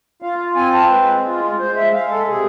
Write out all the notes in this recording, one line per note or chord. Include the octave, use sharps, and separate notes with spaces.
F4 F5
C4 G#5
A5
G#3 B4
F4
F4
G#3 C5
E5
G#3 F5
A4
C3 G#4